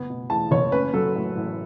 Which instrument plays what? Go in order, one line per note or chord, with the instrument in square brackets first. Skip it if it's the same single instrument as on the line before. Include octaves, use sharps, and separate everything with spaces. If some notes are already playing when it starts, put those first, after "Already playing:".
Already playing: [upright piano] F#1 B3
B2
E2 A5
F#1 C#5
C#4 B4
F#3 A4
A2
A1